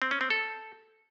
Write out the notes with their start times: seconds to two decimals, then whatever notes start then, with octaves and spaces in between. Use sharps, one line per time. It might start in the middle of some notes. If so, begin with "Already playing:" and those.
0.02 C4
0.11 C#4
0.21 C4
0.30 A4